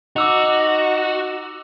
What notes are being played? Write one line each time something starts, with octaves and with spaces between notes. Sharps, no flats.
D#4 F#4 D6 E6 F7